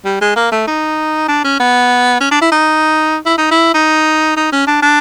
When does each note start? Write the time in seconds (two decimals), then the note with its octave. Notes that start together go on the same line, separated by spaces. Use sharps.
0.05 G3
0.21 G#3
0.36 A#3
0.52 A3
0.67 D#4
1.28 D4
1.44 C#4
1.60 B3
2.20 C#4
2.31 D4
2.42 E4
2.52 D#4
3.26 E4
3.38 D#4
3.51 E4
3.74 D#4
4.37 D#4
4.52 C#4
4.67 D4
4.82 D4